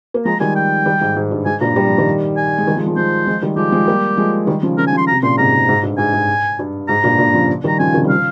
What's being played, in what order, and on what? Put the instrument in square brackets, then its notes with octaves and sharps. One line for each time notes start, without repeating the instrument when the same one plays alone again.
[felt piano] A#3
[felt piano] F3 G#3 [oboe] A#5
[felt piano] D#3 G3 [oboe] G#5
[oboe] G5
[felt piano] D#3 G3
G#2
G#2
G2
[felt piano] G#2 [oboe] G#5
[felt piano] G2 A#2 [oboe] A#5
[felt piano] G3
F3
D#3 G3
[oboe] G#5
[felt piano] G#3
D#3 G3
F3 G#3
F3 G#3
[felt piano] F3 G#3 [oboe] C5
[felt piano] F3 G#3
D#3 G3
[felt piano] F3 G#3 [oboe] G4
[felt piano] F3 G#3
G3 A#3
F3 G#3
D#3 G3
C#3 F3
[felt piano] C#3 F3 [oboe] A#4
[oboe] G#5
[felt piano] C#3 F3
[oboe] C6
[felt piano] C3 [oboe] A#5
[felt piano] A#2 C#3 [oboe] C6
[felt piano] G#2 C3 [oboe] A#5
[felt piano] G#2
G#2
G2
[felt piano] G#2 [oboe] G#5
[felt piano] G#2
G2
[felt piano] G#2 [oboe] A#5
[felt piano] G2 A#2
G2 A#2
C#3 F3
D#3 G3
[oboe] A#5
[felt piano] C#3 F3 [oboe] G#5
[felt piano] C3 D#3
G3
[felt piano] C#3 F3 [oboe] F5